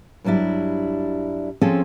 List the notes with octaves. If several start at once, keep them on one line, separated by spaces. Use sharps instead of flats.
G2 F#3 G3 D4 E4
F3 C4 C#4 F4 G#4 A4